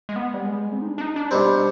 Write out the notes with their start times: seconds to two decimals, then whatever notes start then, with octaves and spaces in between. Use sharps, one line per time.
0.09 G#3
0.16 B3
0.34 G3
0.45 G#3
0.73 C4
0.82 D#4
0.87 D4
0.98 D4
1.01 D#4
1.16 D4
1.31 B2 G3 C4